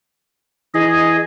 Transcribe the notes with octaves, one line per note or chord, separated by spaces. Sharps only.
E3 G#4 D#5